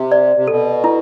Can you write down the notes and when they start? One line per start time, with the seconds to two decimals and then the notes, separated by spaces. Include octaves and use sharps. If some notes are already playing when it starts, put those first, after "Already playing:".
Already playing: C3
0.12 D5
0.36 C3
0.47 B2 A4
0.84 E4